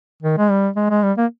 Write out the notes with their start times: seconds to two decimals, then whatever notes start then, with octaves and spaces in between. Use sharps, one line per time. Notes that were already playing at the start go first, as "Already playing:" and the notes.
0.23 D#3
0.38 G#3
0.50 G3
0.76 G#3
0.90 G#3
1.03 G3
1.17 A#3